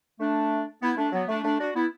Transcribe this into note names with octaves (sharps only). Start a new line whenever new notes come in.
A3 D4
B3 E4
A3 D4
F#3 B3
A3 D4
A3 D4
D4 F#4
B3 E4